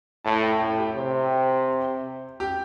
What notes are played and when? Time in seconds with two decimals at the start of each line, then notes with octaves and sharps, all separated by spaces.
0.25 A2 A5
0.43 G5
0.60 A2 G5
0.78 G4
0.96 C3
2.40 G4